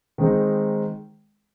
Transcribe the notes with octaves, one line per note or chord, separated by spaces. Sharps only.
D#3 G#3 C4 D#4